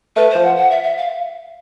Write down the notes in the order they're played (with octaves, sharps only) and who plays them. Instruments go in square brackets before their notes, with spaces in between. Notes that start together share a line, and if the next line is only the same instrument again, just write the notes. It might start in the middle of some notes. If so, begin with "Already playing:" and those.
[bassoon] A3 [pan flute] B4
[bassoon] F3 [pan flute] C5
[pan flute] F#5
F#5
E5
E5
F5